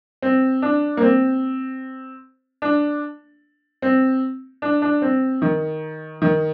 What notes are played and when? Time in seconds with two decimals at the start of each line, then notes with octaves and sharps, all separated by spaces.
0.22 C4
0.62 D4
0.97 A#3
1.02 C4
2.62 D4
3.82 C4
4.62 D4
4.82 D4
5.02 C4
5.42 D#3
6.22 D#3